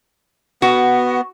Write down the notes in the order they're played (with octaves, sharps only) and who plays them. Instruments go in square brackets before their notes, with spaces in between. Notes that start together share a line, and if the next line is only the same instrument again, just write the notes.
[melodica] B3 [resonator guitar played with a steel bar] F#4